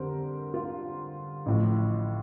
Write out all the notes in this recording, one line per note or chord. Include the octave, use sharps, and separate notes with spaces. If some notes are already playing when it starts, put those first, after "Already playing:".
Already playing: F2 D3 G3 A#4 C5
F4
A1 A2 F3